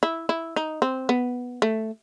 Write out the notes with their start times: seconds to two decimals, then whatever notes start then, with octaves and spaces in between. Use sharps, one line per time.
0.03 E4
0.29 E4
0.56 D#4
0.82 C4
1.09 B3
1.62 A3